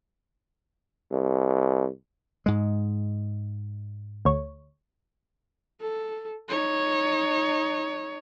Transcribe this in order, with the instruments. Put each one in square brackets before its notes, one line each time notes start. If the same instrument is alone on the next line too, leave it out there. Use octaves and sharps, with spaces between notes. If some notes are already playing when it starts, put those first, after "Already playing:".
[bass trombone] C2
[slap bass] G#2 G#3
[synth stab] D2 C#5
[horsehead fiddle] A4
D#4 C#5